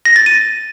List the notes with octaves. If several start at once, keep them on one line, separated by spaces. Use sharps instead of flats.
A#6
A6
D#7